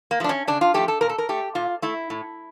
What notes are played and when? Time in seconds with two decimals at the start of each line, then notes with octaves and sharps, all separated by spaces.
0.11 A#3
0.20 F3 A3 D4
0.29 C#4
0.47 C#3 D4
0.61 F4
0.74 F3 A3 G4
0.88 A4
1.01 A#2 A#4
1.09 A4
1.18 A#4
1.29 A3 G4
1.55 A#2 F4
1.82 A3 E4
2.10 A2